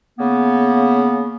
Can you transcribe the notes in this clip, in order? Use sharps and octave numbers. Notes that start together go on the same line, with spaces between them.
C#3 A#3 B3